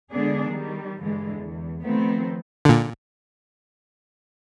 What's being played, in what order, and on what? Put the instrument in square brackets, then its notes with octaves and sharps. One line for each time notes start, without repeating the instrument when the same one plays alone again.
[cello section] D3 G#3 B3 D4 G#4
D#3 G3
G2 D3 E3 G#3
E2
D#3 F3 A3 B3 C4
[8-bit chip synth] A#2 D3